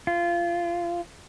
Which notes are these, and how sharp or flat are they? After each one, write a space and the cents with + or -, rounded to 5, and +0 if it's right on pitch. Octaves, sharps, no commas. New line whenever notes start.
F4 -20